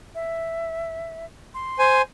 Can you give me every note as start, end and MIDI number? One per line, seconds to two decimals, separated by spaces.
0.15 1.25 76
1.54 2.01 84
1.79 2.02 72
1.79 2.02 80